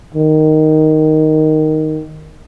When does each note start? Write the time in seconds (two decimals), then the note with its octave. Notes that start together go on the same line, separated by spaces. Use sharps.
0.14 D#3